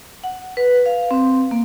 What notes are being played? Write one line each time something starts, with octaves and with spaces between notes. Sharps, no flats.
F#5
B4
F5
C4
A#3